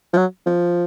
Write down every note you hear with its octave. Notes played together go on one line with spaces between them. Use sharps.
F3
F#3
F3